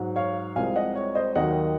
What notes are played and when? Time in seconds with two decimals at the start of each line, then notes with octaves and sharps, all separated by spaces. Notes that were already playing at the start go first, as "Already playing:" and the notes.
Already playing: G#2 F#3
0.16 C#5 F5
0.56 C2 C3 F3 G#3 F5 G#5
0.76 D#5 F#5
0.95 C#5
1.15 C5 D#5
1.35 D#2 D#3 F#3 D#5 F#5